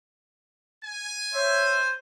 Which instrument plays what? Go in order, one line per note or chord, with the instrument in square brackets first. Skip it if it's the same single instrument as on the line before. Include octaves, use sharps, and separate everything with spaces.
[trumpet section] G#5
[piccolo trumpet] C5 [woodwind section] C#5 E5